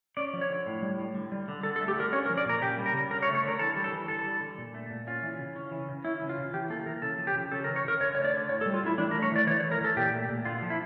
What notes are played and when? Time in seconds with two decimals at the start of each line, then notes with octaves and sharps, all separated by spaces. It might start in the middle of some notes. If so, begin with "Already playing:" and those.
0.17 C#4 D5
0.33 F3
0.41 C#5
0.50 D3
0.66 A2
0.82 G3
0.98 A2
1.15 D3
1.32 G3
1.48 D3
1.63 D3 A4
1.76 A4
1.81 A3
1.88 G4
1.96 D3 A#4
2.12 C#4 C#5
2.26 A#4
2.29 F3
2.38 D5
2.46 A#2 A#4
2.61 C#3 G4
2.78 G3
2.86 A#4
2.94 C#3
3.11 D3 A#4
3.23 C#5
3.27 A3
3.35 C#5
3.43 D3 A#4
3.59 E3 A4
3.76 G3
3.84 A4
3.93 E3
4.08 D3 A4
4.25 G3
4.41 D3
4.58 A#2
4.74 A3
4.91 A#2
5.07 C#4 F4
5.23 E3
5.39 C#3
5.56 C#4
5.71 E3
5.89 C#3
6.05 C#4 E4
6.22 E3
6.29 F4
6.37 C#3
6.53 E3 G4
6.69 A#3 A4
6.86 E3 A#4
7.02 C#3 A4
7.18 F3
7.27 G4
7.35 C#3
7.51 C#4 A4
7.64 A#4
7.68 E3
7.76 C#5
7.84 C#3 A#4
8.01 D3 C#5
8.15 A3 C#5
8.25 D5
8.34 D3
8.49 A2 C#5
8.61 A4
8.66 G3
8.74 F4
8.83 A2 E4
8.98 E3 D4
9.11 A#4
9.14 A3
9.23 C#5
9.32 E3 D5
9.47 E3 C#5
9.60 C#5
9.64 A3
9.72 A#4
9.81 E3 A4
9.97 A#2 G4
10.13 A3
10.29 A#2
10.45 D3 F4
10.62 F3
10.70 E4